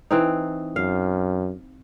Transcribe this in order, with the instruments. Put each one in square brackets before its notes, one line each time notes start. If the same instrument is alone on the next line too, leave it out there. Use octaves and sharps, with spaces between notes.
[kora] E3 C4 D#4
[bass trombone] F#2 [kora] F5